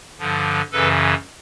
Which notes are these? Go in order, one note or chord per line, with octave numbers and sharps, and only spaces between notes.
G2 D3 F3
F#2 C#3 E3 A4 B4